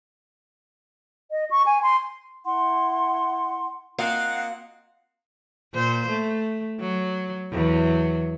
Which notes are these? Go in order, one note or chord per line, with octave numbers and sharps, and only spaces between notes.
D#5
C#6
G#5
C6
E4 F#5 C6
A#3 C4 F4 D#5 F5 F#5
A#2 C5
A3
F#3
E2 F#3